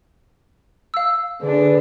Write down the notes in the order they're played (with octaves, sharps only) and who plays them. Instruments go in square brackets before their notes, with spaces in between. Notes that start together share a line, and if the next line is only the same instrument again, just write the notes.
[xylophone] F5 E6
[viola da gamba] D3 D4 [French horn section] G#4 B4